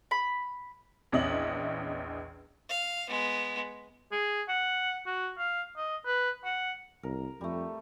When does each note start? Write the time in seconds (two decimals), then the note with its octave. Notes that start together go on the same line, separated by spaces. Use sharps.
0.11 B5
1.12 A#1 E2 C#4 D#5 E5 F#7
2.69 F5
3.09 G#3 B3
4.12 G#4
4.48 F#5
5.06 F#4
5.38 F5
5.77 D#5
6.06 B4
6.44 F#5
7.03 C2 A#4
7.41 F2 G3 A3